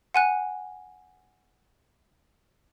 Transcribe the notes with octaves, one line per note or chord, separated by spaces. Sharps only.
F#5 G#5 F#6